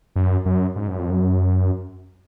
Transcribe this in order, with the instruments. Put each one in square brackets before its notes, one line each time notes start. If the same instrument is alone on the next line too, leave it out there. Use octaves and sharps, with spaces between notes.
[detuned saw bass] F#2
F#2
G#2
F#2
F2
F#2